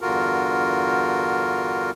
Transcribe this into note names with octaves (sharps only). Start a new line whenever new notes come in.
E2 G2 D3 F4 F#4 A#4